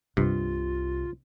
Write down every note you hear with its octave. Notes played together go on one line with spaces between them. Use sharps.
C2 G2 C3 F4